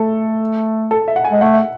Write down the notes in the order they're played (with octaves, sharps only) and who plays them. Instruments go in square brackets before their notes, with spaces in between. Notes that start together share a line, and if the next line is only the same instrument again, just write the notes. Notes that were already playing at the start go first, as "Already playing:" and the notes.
Already playing: [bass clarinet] A3 [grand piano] A4
[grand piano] A4
E5
F#5
G#5
[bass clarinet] G#3
[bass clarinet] A3 [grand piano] F#5
[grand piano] E5